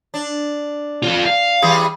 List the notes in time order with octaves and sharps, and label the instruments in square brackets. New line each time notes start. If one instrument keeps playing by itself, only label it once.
[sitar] D4
[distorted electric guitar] F4 A4
F5
[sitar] E3 G3 G#4